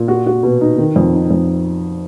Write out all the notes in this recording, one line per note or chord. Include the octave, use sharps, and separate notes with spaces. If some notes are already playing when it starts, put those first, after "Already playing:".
Already playing: A#2
F#4
F#4
B2
D#4
D#3
F2
D#4
F2